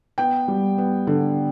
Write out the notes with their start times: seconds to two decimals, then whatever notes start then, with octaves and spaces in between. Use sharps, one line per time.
0.18 B3 G5
0.48 G3
0.78 B3
1.07 D3